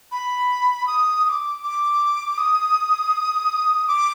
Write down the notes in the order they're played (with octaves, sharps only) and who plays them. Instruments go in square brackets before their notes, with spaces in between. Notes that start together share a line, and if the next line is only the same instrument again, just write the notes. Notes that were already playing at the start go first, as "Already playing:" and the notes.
[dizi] B5
D#6
D#6
D6
D6
D#6
D6